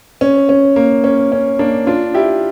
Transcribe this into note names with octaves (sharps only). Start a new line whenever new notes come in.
C#4
C#4
A#3
C#4
C#4
A#3 D4
D4 F4
E4 G4